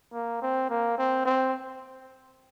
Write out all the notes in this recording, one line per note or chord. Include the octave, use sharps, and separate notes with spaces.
A#3
C4
A#3
C4
C4